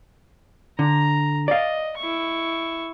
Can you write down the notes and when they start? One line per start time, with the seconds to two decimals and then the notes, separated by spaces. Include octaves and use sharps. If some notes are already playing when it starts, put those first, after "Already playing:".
0.79 D3 A#5
1.48 D5 D#5 F5
1.97 E4 C#6